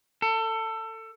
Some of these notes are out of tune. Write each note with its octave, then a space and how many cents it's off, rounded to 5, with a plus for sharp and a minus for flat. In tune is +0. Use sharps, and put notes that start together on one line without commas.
A4 +25